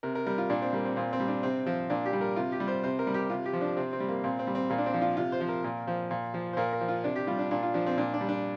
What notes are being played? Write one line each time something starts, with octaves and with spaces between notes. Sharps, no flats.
C3 A#4
A#4
G3 A#4
F4
A#2 D4
C4
G3 A#3
C4
A#2 C4
C4
G3
D4
C3 C4
F3 C4
A#2 D4
G4
G3
A#4
C3 F4
G4
G3
C5
C3 C5
A#4
G3
G4
C3 F4
G4
F3
D4
C3 C4
C4
G3
A#3
A#2 C4
C4
G3
C4
A#2 A#3
D4
C4
F3
F4
C3 F4
C5
F3
A#4
A#2
F3
A#2
F3
C5
A#2 A#4
A#4
F3
F4
C3 D4
G4
G3 F4
D4
A#2 D4
F4
F3 D4
C4
A#2 D4
D4
G3
D4